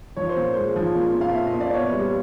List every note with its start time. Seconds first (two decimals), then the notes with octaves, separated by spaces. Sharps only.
0.16 F3 C#5
0.29 C5
0.37 A#2
0.54 G#3 C5
0.76 F3
0.95 A#2
1.15 A#2
1.21 F5
1.33 A#2 E5
1.47 D#5
1.54 A#2
1.60 D5
1.73 B3 C#5
1.93 G3